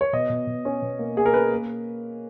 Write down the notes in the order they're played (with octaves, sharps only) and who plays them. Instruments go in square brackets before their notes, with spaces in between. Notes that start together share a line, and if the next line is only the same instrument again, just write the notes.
[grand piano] C#5
B2 D#5
B2
B2
C#4
B2
A#3
A#3 G#4
A#4
C#4 B4
A#3